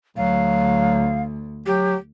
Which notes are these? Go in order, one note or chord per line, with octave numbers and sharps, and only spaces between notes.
D2 F#3 F5
F#3 G4